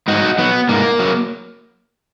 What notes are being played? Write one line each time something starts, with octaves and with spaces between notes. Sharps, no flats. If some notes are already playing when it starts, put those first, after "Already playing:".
G#2 D#4 F#4
F#3 B3
G#2 A#3
F#3